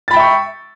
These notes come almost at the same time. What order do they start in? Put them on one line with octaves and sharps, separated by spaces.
A6 B5 G5 E5 C#6